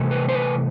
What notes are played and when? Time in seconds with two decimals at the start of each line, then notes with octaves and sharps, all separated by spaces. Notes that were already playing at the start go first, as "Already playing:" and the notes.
Already playing: C3 E3 A3
0.11 B4
0.29 C5
0.34 B4